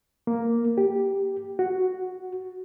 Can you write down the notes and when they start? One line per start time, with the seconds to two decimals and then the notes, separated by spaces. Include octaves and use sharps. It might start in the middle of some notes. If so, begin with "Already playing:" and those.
0.27 A#3
0.78 G4
1.59 F#4